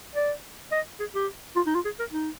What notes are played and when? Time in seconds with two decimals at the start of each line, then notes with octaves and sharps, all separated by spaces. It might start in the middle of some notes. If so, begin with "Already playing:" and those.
0.15 D5
0.72 D#5
1.00 G#4
1.14 G4
1.56 F4
1.67 D#4
1.75 F4
1.85 G#4
2.00 A#4
2.12 D#4